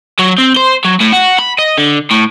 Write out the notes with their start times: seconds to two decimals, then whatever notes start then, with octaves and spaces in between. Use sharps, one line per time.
0.19 F#3
0.38 C4
0.57 C5
0.85 F#3
1.01 A2
1.13 F#4
1.39 B5
1.59 D#5
1.78 D3
2.11 A2